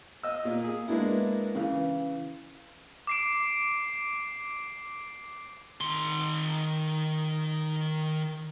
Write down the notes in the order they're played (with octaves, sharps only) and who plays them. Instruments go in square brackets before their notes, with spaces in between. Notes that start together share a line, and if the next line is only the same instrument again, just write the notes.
[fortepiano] D#5 E6
A#2
G#4
G#3 A#3 B3 D4 E4
C#3 E3
[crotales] D6 C7 D7
[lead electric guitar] D#3 C6